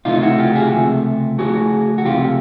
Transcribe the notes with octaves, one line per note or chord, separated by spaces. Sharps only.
C#2 C3 F3 A3 D#4 F4
E4 F#4
F4 G4
F#4 G#4
C#2 C3 F3 A3
C#2 C3 F3 A3 F#4 G#4
F#4
C#2 C3 F3 A3 F4 G4